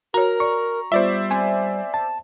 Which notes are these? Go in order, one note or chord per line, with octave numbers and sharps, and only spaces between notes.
F#4 A#4 C#5 A#5
D5 C#6
G3 B3 F4 C5 D5 E5
C4 G#5 C6
A5